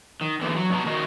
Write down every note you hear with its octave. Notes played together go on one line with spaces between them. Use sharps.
D#3
E2 D3 E3
F#3
G2 B2 B3 A#5
D#3 F#4 D#5